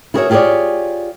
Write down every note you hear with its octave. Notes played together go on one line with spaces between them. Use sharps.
E4 F#4 G#4 A#4 C#5 E5
F4 G4 G#4 A#4 C#5 D5